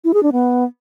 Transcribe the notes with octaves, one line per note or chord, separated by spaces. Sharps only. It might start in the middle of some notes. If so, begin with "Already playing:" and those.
E4
G#4
D4
B3